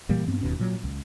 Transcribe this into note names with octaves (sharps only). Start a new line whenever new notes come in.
A#2 E3 G3 A#3
G2 B3 C4
E1 D#2 B2 C#4
A#2 F#3
C#2